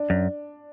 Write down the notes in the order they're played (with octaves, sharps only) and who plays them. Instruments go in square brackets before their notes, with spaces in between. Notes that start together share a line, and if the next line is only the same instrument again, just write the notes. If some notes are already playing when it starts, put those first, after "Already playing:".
Already playing: [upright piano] D4
[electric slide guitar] F#2